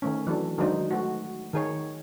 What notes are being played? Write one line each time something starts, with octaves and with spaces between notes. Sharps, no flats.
D#3 A3 C#4
E3 F#3 D4 A4
D#3 F#3 G#3 D4 D#4 C5
A3 F#4
D#3 G#4 C#5